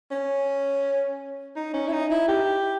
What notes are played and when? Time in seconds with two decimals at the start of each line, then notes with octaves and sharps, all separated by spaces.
0.11 C#4
1.56 D#4
1.74 C#4
1.88 E4
1.93 D#4
2.11 E4
2.28 G4